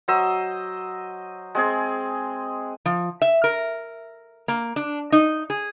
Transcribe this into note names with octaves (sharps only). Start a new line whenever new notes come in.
F#3 C5 D#5 E6
G#3 C4 G#4
F3
E5
A#4
A#3
D4
D#4
G#4